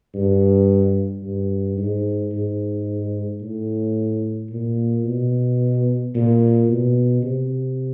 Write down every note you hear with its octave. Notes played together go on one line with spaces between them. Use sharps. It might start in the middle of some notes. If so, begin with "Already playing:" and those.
G2
G2
G#2
G#2
A2
A#2
B2
A#2
B2
C3